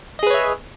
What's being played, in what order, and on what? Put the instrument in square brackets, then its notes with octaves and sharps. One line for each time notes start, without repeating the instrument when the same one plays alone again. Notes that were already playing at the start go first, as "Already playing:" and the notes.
[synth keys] D#5
G#4
B4
C#5
E5